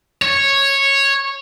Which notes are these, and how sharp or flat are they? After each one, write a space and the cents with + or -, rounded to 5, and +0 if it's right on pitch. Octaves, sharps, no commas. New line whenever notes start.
C#5 -10